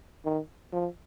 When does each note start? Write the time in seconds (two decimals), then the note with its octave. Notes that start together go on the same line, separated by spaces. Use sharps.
0.25 D#3
0.73 F3